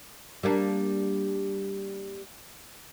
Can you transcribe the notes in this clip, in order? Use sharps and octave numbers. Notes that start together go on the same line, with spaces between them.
G3 A#3 D4